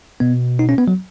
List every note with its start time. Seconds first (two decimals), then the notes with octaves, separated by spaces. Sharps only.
0.20 B2 B3
0.59 D#4
0.69 C#4
0.78 B3
0.88 F#3